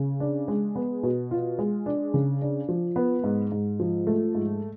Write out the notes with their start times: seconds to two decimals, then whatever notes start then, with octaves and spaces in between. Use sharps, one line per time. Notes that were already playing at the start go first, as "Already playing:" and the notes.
Already playing: C#3
0.20 D4
0.48 G#3
0.75 B3
1.03 B2
1.31 F4
1.59 G#3
1.86 D4
2.14 C#3
2.42 D4
2.69 F3
2.96 B3
3.24 G#2
3.52 G#2
3.80 F3
4.07 A3
4.35 G#2